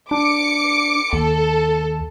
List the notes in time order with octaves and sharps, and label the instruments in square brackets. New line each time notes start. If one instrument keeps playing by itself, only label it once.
[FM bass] D4 [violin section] D6 C#7
[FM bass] D#2 [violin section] A4